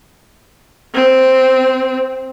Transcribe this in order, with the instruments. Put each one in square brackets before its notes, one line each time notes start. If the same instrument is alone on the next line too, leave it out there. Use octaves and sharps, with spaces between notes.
[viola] C4